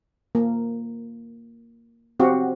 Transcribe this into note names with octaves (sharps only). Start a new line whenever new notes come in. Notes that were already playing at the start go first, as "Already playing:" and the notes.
A#3
C4 F#4 G4 F5